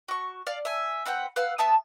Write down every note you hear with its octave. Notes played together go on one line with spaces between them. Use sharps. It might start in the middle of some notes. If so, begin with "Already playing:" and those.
F#4 C#6
D5 F5
E5 G#5
C4 B4 F#5 G5
B4 F5 F#5 E6
B3 E5 A5 D#6